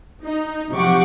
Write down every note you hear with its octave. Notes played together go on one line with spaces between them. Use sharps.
D#4
C3 F3 G4 F#5 C#6 D6